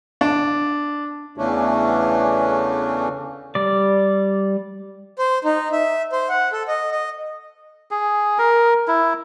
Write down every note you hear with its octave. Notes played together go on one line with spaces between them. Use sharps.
D4
E2 C#3 E3 A3 C#4 D4
G3 D5
C5
D#4
E5
C5
F#5
A4
D#5
D#5
G#4
A#4
E4